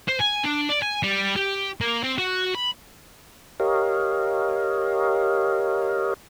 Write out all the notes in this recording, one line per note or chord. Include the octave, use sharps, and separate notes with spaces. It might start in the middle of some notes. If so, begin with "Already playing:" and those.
C5
G#5
D4
D5
G#5
G3
G4
A#3
C4
F#4
B5
G4 A#4 C#5 D#5 F5